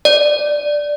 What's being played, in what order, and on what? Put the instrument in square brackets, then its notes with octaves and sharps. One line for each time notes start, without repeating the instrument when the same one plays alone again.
[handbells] D5